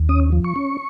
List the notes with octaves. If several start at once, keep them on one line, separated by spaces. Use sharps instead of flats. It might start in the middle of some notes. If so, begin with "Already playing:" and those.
Already playing: D#2
C#4 D#6
F3
C#6
C#4